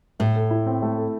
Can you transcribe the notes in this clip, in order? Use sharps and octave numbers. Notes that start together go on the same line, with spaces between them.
A2 A3
A4
E4
C4
A3
A4